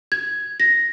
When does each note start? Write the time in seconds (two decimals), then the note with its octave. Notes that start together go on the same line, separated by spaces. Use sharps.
0.12 G#6
0.60 A#6